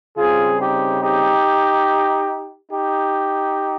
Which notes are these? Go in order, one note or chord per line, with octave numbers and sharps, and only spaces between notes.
C#3 G3 C4 F4 G#4
D#4 G4
D#4 G4
D#4 G4